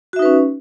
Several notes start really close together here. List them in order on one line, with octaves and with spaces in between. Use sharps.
F#4 E5 D#4 B4 C#4